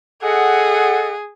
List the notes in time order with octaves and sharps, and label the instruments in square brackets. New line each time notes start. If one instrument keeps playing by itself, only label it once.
[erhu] G#4 [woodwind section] A4 D#5 F#5